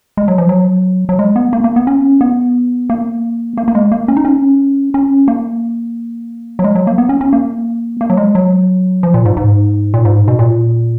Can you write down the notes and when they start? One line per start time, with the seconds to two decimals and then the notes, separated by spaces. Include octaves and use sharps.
0.17 G#3
0.28 F#3
0.38 F3
0.49 F#3
1.09 F#3
1.19 G#3
1.36 B3
1.53 A#3
1.64 A#3
1.76 B3
1.87 C#4
2.21 B3
2.90 A#3
3.57 A#3
3.68 A#3
3.75 G#3
3.92 A#3
4.08 C#4
4.17 D#4
4.25 C#4
4.94 C#4
5.28 A#3
6.59 F#3
6.64 G#3
6.75 F#3
6.87 A#3
6.98 B3
7.09 C#4
7.21 C#4
7.33 A#3
8.01 A#3
8.10 F#3
8.17 G#3
8.35 F#3
9.03 F3
9.14 A#2
9.25 G#2
9.37 G#2
9.94 A#2
10.05 G#2
10.28 B2
10.39 A#2